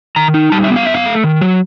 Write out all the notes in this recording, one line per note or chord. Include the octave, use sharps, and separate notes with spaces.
D#3 A#5
D#4
G3 A5
E5
B3
F5
F#2 E5
F5
A3
D#3
F#3